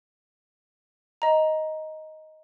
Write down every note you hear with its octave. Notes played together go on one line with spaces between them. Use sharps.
D#5 A#5